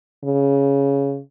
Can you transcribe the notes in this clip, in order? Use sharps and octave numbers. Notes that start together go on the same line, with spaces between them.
C#3